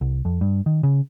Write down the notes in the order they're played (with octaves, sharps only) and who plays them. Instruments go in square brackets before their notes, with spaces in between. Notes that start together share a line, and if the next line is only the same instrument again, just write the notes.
[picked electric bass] C2
F2
G2
D#3
C#3